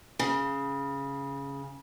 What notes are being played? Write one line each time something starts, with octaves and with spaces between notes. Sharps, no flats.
C#3